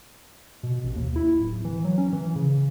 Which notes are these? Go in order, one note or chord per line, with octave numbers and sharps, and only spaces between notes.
B2
A1
D#2
E4
D1
E3
F#3
C#4
E3
C#3